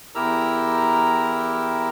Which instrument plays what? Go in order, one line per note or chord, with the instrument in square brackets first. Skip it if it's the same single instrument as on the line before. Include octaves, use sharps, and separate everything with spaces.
[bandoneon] E2 E4 G4 A#4 A#5 E6